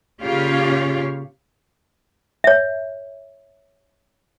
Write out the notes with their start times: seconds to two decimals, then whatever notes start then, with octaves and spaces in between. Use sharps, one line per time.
0.22 A#2 C#3 F4 G4 C#5 F5
2.44 C#5 E5